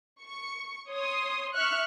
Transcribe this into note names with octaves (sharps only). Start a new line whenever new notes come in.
C#6 C#7
C#5 C6 D#6
E5 C#6 F6 F#6